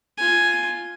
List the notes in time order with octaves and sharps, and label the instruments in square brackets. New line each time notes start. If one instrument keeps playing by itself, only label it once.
[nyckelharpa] F4 G#5